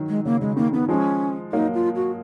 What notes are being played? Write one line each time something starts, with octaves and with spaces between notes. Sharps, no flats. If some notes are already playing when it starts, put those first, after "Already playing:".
Already playing: D#3 F#3
G#3
C#3 A#3
C#3 G#3
D#3 A#3
D#3 B3
F3 G#3 C#4
F#3 A#3 D#4
F4
F#4